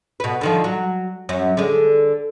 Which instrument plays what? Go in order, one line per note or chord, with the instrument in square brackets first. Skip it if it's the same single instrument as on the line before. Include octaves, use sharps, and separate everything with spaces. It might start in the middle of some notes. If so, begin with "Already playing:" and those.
[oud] B2 B4
D3 D#3 F3
F#3
F#2 C#4
D3 G#3